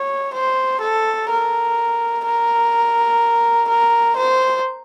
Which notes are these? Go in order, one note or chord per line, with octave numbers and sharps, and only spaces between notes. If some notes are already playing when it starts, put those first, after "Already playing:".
Already playing: C#5
C5
A4
A#4
A#4
A#4
C5